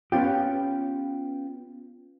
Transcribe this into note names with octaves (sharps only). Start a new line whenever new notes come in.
B3 C#4 F4 G4